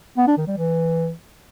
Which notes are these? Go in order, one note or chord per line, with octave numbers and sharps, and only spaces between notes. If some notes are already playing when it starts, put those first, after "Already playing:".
B3
D4
D#3
G3
E3